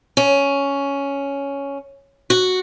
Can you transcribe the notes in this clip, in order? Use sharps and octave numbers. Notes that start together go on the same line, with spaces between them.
C#4
F#4